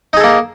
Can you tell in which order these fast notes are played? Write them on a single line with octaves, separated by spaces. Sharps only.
D#4 G#4 A4 A#3